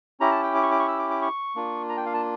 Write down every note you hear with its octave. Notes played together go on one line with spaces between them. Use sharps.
C#4 E4 G4 A#5
A5
G5
D6
C#6
D6
C#6
E6
D6
D6
C#6
A#3 D4 F4
A#5
G5
F5
A5